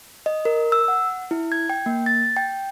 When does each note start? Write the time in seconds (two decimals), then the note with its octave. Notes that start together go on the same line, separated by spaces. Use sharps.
0.26 D#5
0.45 A#4
0.72 E6
0.88 F#5
1.31 E4
1.52 G#6
1.70 G5
1.86 A#3
2.06 A6
2.37 G5